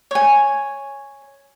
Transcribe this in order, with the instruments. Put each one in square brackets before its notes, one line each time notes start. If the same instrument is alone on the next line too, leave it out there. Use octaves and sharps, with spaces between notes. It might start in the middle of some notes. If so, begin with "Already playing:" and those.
[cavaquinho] C#5 G#5